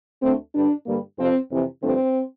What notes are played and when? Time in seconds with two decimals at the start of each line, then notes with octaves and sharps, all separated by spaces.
0.22 D2 D3 A3 C4
0.55 G2 D3 G3 D4
0.87 G2 D3 G3 A#3
1.18 F2 C3 F3 C4
1.50 F2 C3 E3
1.83 G2 D3 F3 A3 C4